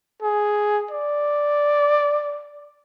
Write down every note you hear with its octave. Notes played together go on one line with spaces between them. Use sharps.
G#4
D5